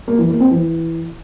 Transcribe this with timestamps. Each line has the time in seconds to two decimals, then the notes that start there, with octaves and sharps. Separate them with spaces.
0.08 A#3
0.19 E3
0.29 A#3
0.40 C4
0.51 E3